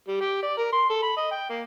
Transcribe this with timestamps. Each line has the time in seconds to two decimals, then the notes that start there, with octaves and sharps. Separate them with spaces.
0.08 G3
0.20 G4
0.43 D5
0.57 A#4
0.72 C6
0.90 A4
1.02 B5
1.17 D#5
1.31 G5
1.50 A#3